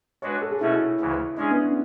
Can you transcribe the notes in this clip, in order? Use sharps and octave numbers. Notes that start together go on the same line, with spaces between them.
G#3 D4 F#4 B4 C#5
A4
G#4
B2 A3 C#4 E4 F#4
D2 C#3 E3
G#3 C#4 D4 G#4
B3
C#4